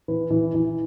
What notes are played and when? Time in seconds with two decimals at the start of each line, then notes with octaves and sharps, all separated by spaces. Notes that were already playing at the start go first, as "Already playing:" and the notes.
0.08 E3 B4
0.30 E3
0.54 E3